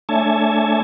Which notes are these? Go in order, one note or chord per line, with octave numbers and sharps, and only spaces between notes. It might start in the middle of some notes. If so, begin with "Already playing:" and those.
A3 D4 C#5 E5 G#5 A5